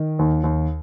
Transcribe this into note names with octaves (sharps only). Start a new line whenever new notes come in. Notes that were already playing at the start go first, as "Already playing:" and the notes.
Already playing: D#3
D#2
D#2